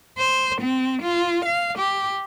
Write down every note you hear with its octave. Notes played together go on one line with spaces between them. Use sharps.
C5
C4
F4
F5
G4